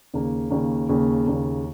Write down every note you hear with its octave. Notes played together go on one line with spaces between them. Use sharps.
D#2 C#3 A#3
D#2 C#3 A#3
D#2 C#3 A#3
D#2 C#3 A#3